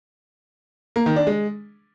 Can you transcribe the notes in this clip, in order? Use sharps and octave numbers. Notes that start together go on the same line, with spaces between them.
A#3
D#3
D4
G#3